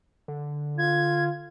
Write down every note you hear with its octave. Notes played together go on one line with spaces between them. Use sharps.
D3
F4 G#6